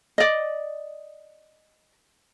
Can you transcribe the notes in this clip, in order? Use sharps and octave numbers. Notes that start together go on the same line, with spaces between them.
D5 D#5